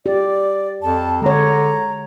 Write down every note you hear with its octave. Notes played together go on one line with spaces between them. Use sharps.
G4 D5
F2 A5
D3 G#3 C#5 A#5